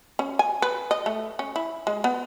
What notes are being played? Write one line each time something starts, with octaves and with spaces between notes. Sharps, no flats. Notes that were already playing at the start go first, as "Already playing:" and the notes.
C#4
G#5
B4
D#5
A3
C#4
E4
G#3
B3